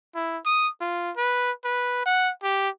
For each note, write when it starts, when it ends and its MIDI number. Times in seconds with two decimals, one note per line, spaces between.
0.15 0.38 64
0.45 0.69 87
0.80 1.11 65
1.16 1.51 71
1.64 2.01 71
2.06 2.31 78
2.43 2.69 67